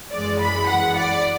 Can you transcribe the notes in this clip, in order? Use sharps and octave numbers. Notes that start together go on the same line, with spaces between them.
F#2 E3 G#3 D5
B5
F#5
D5